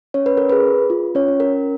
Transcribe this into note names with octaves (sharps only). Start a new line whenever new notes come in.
C#4 C#5
B4
A#4
G#4 B4
F4
C#4 C#5
C#4
A#4